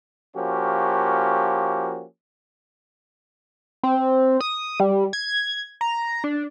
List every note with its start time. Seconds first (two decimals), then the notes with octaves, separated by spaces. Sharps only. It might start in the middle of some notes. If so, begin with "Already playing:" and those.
0.37 F3 A#3 C#4 F#4 G4
3.83 C4
4.41 D#6
4.80 G3
5.13 G#6
5.81 A#5
6.24 D4